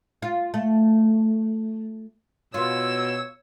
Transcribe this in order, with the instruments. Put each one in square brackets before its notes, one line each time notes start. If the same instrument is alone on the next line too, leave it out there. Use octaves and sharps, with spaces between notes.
[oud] F4
A3
[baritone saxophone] B2 [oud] B3 F4 [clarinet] C#5 [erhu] E6